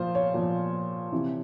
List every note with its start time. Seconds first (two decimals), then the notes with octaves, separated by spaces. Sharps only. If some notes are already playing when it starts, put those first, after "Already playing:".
Already playing: A#2 F3 F4 C5
0.15 C#5
0.34 A#2 F3
1.12 C3 E3